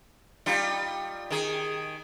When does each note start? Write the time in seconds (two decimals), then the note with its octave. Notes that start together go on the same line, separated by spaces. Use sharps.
0.46 G3 D#4 F4
1.31 D#3 G#4